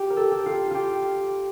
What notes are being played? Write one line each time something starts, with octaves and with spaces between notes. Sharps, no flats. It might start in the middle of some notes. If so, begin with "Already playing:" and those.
Already playing: F4 G4
A#4
A4
G4
F4
F4 G4